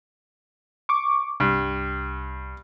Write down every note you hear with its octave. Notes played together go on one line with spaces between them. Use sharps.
C#6 D6
C2 G2